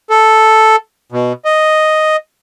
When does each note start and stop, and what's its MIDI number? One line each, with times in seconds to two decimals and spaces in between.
0.10 0.76 69
1.12 1.33 47
1.45 2.16 75